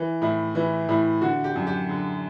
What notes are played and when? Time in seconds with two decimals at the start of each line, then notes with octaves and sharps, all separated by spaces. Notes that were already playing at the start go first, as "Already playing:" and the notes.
Already playing: E3
0.22 A2 E4
0.55 E3 E4
0.89 A2 E4
1.21 D3 F#4
1.44 G4
1.56 F#2
1.67 G4
1.89 D3